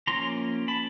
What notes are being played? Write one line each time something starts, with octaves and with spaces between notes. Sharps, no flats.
F3 A#3 C#4 A#5 C6
A5 B5